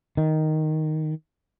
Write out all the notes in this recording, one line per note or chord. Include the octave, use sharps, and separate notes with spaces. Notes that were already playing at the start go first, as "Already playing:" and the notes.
D#3